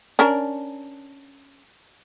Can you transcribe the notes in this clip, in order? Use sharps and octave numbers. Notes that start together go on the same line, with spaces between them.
C#4 D4 A#4